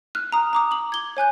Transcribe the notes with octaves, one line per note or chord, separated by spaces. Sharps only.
F6 F#6
A#5 D#6
A#5 D6 D#6
D6 F#7
G#6 G7
C#5 G#5 F#6 G6